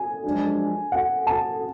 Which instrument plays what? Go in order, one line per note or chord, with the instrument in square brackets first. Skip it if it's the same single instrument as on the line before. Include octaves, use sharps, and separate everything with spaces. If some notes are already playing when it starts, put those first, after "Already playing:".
Already playing: [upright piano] G#5
[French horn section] F#2 F3 G#3 D4
[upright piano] F#5
A5